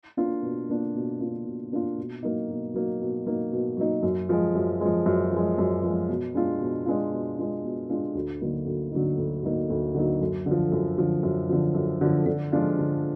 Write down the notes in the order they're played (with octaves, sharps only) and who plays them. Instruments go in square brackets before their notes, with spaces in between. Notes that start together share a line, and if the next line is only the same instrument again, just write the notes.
[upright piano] A#3 D4 F4
B2
A#3 D4 F4
B2
A#3 D4 F4
B2
A#3 D4 F4
B2
F#3 A#3 D#4
B2
F#3 A#3 D#4
B2
F#3 A#3 D#4
B2
F#3 A#3 D#4
F#2
F3 G#3
F#2
F3 G#3
F#2
F3 G#3
F#2
F3 G#3
B2
G#3 D4 F4
B2
G#3 D4 F4
B2
G#3 D4 F4
B2
G#3 D4 F4
D2
D3 F#3 A#3 D#4
D2
D3 F#3 A#3 D#4
D2
D3 F#3 A#3 D#4
D2
D3 F#3 A#3 D#4
F#2
D3
F3
F#2
D3 F3
F#2
D3 F3
F#2
D3 F3
D3
F3 G#3 D4 F4
D3